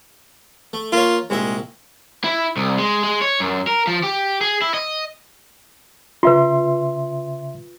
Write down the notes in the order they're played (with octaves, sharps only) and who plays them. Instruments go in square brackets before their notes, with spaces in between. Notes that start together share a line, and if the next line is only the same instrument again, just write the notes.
[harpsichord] A3
[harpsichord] A#3 C#5 [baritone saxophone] F4
[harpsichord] C2 A#2 E5 [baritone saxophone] G#3
[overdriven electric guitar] E4
C2
G#3
G#3
C#5
F#2
A#4
F3
G4
G#4
E4
D#5
[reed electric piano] C#3 E5 C6 [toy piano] F4 B4